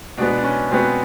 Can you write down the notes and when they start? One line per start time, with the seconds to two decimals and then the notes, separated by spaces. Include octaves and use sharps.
0.18 B2 G#3 B3 D4
0.38 D4
0.44 C#4
0.71 B2 G#3 B3 C4